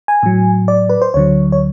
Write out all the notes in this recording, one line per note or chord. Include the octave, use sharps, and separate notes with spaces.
G#5
A2 F#3
D5
B4
C5
D2 D3 F#3 C#5
C#5